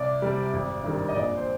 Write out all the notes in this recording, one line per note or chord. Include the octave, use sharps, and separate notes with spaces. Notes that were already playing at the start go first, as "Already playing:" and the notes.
Already playing: C2 D5
C3 G3
G#1
G2 D#3 G3
D#5
A#1 D5
C5